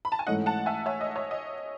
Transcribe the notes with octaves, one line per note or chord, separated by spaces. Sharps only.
B5
A5
G#5
G#2 E3 A3 C#4 D#5 F#5
F#5 A5
E5 G#5
C#5 E5
D#5
C#5
D#5